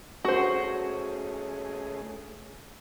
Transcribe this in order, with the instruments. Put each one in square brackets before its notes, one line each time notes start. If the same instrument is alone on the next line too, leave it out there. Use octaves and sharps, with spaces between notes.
[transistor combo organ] A3 C#4 G#4 [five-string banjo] F#4 C5